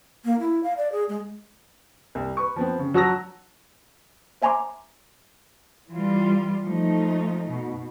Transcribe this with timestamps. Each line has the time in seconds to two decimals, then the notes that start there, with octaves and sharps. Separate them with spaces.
0.25 A#3
0.39 E4
0.63 F5
0.77 D5
0.92 G#4
1.09 G#3
2.15 C2
2.37 B4 C#6
2.56 F3 B3 C4
2.79 C#3
2.94 F#3 F#4 A5 A#5 E6 A#6
4.42 C5 E5 G#5 A#5 C6 D6
5.91 E3 G3 F4
6.64 F3 A3 D#4
7.52 B2